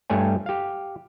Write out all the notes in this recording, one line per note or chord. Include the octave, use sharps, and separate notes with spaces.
G2 G3 A3 C#5 G#5
G4 F5